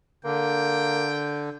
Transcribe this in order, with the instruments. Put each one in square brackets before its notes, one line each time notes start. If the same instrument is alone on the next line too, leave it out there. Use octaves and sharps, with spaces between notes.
[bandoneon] D3 [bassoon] A#3 [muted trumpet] G5